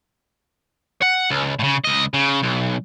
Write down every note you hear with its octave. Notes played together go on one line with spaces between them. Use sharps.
F#5
C#2
A2 C#3
C#2 D#5
C#3
B1